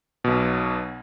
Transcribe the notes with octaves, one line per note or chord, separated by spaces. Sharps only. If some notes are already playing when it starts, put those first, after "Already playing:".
B1 B2